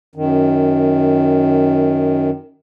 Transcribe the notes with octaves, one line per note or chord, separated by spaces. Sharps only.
F#2 D#3